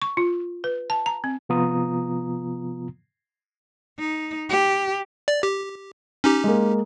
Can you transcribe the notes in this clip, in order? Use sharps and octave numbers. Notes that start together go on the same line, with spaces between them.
C#6
F4
B4
A5
A#5
C4
C3 F3 B3 F4 A#5 D#6
D#4
G4
D5
G4
C#4 D#4 G4
G#3 A#3